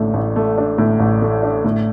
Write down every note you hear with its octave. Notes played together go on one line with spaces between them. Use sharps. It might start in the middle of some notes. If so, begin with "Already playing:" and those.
Already playing: A1 A2 A3 D4
A1
A3
D4
A2
A1
A3
D4
A2